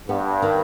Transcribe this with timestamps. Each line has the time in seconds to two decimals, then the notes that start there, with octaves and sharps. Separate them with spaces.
0.08 G2 B3
0.42 D#3